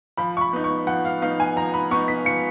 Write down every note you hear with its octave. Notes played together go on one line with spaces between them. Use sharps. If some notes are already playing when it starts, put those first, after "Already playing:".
F3 B5
C#6
B5
B3 D#4
C#6
F3 F#5
F5
B3 D#4 F5
G#5
F3 A#5
B5
B3 D#4 C#6
B6
F3 C#7